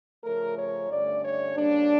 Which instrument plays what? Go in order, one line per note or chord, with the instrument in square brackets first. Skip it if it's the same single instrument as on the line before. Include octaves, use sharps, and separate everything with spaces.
[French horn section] C#3 F3 A3 C#4 A#4
C#5
G2 D3 A3 C#4 D5
C#5
C#3 G3 A#3 D4